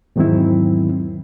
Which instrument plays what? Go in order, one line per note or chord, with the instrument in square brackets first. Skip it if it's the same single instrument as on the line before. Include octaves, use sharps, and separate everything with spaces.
[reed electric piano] E2 G#2 D#3 F#3 C4 E4